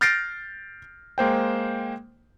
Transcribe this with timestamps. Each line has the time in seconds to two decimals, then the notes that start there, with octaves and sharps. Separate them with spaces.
0.01 F6 G6 A6 A#6 C7 D7
1.18 G#3 A#3 C5 G5